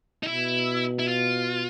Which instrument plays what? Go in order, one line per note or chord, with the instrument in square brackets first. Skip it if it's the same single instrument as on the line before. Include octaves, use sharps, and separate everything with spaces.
[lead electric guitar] D#4
[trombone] B2 [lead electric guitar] E4
[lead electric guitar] E4
F4